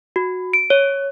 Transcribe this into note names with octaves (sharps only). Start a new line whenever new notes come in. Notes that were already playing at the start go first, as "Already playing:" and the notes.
F#4
D7
C#5